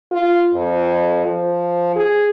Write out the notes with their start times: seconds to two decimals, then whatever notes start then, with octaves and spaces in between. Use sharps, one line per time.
0.11 F4
0.54 F2
1.25 F3
1.96 G#4